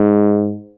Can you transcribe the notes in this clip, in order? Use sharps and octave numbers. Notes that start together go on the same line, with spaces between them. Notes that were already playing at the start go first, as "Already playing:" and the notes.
Already playing: G#2